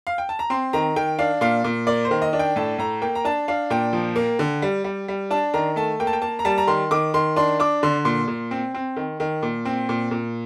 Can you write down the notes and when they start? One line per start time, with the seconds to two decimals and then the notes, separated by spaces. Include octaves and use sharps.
0.07 F5
0.18 G5
0.29 A5
0.39 A#5
0.50 C4 C6
0.73 D#3 A#5
0.96 D#3 G5
1.19 D4 F5
1.41 A#2 F5
1.64 A#2
1.87 A#3 D5
2.05 C5
2.11 D#3
2.22 D#5
2.33 D4
2.39 G5
2.56 A2 A5
2.78 A2 A#5
3.02 A#3 G5
3.15 A#5
3.25 D4 A5
3.48 D4 F5
3.70 A#2 G5
3.93 F3
4.16 A#3
4.39 D3
4.62 G3
4.84 G3
5.08 G3
5.31 D4 A5
5.54 D#3 A#5
5.76 A3 A5
6.00 A#3 G5
6.07 A5
6.13 G5
6.22 A#3 A5
6.39 A#5
6.45 G3 A5
6.58 A#5
6.67 D#3 C6
6.91 D#3 D6
7.14 D#3 C6
7.36 D4 C6
7.60 D4 D6
7.83 D3 C6
8.05 A#2 C6
8.28 A#2
8.51 C4
8.74 C4
8.96 D#3
9.20 D#3
9.43 A#2
9.65 C4
9.89 A#2
10.11 A#2